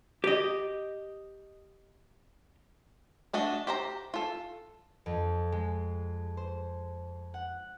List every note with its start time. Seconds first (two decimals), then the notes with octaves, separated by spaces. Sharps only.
0.24 G4 D#5
3.33 A3 D4 F#4 D#5
3.67 G4 C5 A#5
4.14 F4 A4
5.06 F2
5.52 G#3
6.37 C5
7.34 F#5